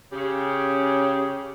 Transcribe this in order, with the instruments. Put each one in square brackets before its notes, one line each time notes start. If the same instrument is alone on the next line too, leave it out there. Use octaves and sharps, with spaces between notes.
[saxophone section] C#3 G4